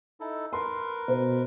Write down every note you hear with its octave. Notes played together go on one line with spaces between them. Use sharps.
D#4 E4 A4
A#4 B4 C6
B2 C5